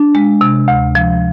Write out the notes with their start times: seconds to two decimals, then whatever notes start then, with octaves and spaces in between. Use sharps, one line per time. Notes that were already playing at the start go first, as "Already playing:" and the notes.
Already playing: D4
0.15 G#3
0.41 C3
0.68 D2
0.95 F3